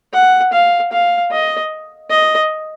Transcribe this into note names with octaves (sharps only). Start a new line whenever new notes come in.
F#5
F5
F5
D#5
D#5